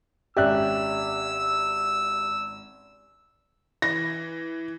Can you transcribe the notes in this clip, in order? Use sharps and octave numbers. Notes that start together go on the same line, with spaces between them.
G#1 C#4 G4 D5 E5 E6 F#6
E3 A#6